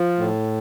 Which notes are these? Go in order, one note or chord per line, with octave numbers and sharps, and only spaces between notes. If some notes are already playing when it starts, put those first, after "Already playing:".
Already playing: F3
A2